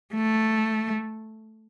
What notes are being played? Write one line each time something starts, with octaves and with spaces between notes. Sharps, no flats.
A3